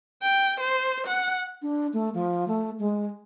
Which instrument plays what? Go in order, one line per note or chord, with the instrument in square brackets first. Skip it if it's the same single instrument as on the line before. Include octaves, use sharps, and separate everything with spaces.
[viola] G5
C5
F#5
[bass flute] D4
A3
F3
A3
G#3